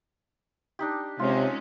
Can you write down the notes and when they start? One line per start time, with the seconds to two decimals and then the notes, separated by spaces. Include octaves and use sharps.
0.79 D4 D#4 G4
1.19 C3 G#3 C4 C#4 F4